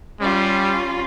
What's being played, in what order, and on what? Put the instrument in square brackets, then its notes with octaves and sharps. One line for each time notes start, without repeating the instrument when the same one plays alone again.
[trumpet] G3 [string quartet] C#4 F4